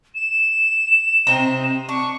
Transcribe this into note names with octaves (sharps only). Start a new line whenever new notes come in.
E7
C3 C4 D#4
D4 C#6